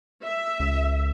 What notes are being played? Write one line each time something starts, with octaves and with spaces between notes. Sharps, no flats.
E5
C#2